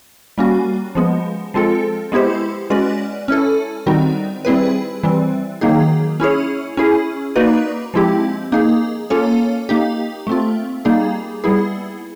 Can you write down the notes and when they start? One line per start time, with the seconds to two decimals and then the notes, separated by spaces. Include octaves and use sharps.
0.38 G3 A#3 C#4 F#4
0.95 F3 G#3 B3
1.54 F3 G#3 C4 F4 A4
2.12 G#3 B3 E4 G4 C5
2.70 G#3 C#4 F#4 B4 D5
3.28 C#4 E4 A4
3.86 D#3 G3 C4 D#4 F#4
4.45 G3 C4 E4 G#4 B4
5.03 E3 G3 C4
5.61 D#3 F#3 A#3 D#4 G#4
6.20 C#4 E4 G#4 C#5
6.77 C#4 E4 G#4
7.36 A#3 D#4 F#4 B4 D5
7.94 F3 G#3 C4 E4 G4
8.52 A#3 D#4 G#4
9.10 A#3 C#4 F4 A4 C#5
9.69 A#3 D#4 G4
10.27 A3 C4 F4
10.85 G3 A#3 D#4 G#4
11.44 G3 B3 E4 G#4